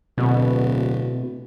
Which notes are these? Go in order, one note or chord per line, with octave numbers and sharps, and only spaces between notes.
D1 B2